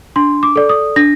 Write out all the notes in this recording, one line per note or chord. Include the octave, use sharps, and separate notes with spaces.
D4 C6
D6
A4 D5
D#6
D4 A#6